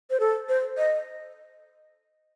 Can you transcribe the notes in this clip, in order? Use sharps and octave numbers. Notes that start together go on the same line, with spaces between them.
C5
A4
C5
D#5